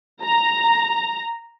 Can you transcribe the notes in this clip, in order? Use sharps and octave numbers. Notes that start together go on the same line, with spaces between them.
A#5